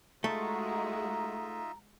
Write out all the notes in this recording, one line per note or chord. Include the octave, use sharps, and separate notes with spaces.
G#3 A3 D#4 F4 F#4 E5 A#5